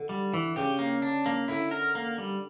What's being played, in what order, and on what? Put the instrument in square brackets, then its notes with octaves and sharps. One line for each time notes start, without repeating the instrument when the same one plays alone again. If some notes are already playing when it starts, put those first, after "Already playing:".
Already playing: [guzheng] D3
[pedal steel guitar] G3
E3
[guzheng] C#3 [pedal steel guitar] G4
[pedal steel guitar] A#3
D4
A#3
[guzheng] D3 [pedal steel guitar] E4
[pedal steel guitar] A#4
A#3
G3